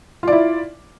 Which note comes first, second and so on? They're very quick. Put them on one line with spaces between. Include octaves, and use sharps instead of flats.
F4 D5 E4